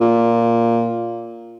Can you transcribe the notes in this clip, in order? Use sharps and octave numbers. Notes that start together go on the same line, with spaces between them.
A#2